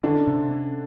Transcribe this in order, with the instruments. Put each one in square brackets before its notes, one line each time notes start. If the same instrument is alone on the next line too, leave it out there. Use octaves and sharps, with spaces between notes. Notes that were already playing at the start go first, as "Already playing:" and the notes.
[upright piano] D3 D4 [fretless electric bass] C#4
[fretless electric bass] C3
C#4